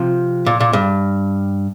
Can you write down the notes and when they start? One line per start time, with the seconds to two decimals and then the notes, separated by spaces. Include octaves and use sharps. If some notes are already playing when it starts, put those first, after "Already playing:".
Already playing: C3 F3
0.46 A#2
0.60 A#2
0.73 G2